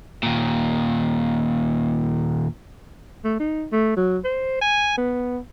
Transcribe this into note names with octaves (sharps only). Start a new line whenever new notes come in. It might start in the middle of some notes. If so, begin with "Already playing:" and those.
D#2 A#2
A3
D#4
A3
F#3
C5
G#5
B3